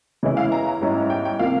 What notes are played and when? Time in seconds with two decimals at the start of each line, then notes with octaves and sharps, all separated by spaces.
0.23 C#3 E3 G#3 C#4 E4
0.37 F5
0.52 A#5
0.81 G#2 G3 C#4 E4
1.10 G5
1.25 G5
1.39 C3 F3 A#3 F5